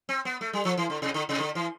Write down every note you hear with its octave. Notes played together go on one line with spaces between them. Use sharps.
C4
B3
A3
G3
F3
E3
D3
C3
D3
C3
D3
E3